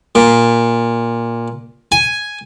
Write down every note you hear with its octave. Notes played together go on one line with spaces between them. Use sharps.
A#2
G#5